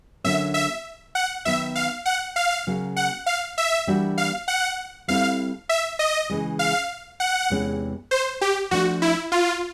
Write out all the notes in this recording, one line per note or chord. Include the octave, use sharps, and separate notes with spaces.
D3 F#3 A#3 C#4 E5
E5
F#5
D#3 F#3 B3 E5
F5
F#5
F5
C#3 F#3 A#3
F#5
F5
E5
E3 G3 A#3 D4 F#4
F5
F#5
G3 C4 E4 A4 F5
E5
D#5
C#3 E3 G#3
F5
F#5
E2 C3 E3 G#3 C#4
C5
G4
F3 A3 D4 F4 F#4
E4
F4